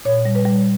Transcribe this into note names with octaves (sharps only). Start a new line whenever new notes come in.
A#2 C#5
G3
B4
G3